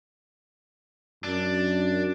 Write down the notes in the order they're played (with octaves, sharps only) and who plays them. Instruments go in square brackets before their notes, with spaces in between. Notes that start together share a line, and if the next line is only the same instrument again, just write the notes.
[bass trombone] F#2 [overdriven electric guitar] D4